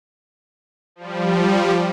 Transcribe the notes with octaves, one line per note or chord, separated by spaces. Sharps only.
F3 G3